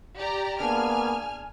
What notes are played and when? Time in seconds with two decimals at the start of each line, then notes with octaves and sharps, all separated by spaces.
0.17 G4 D5 A#5
0.60 A#3 B3 D4 G#4 G#5 F6